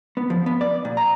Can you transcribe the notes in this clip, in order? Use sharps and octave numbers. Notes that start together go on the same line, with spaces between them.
B3
F3
B3
D5
A#2
A#5